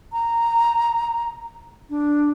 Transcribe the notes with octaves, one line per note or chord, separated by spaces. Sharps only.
A#5
D4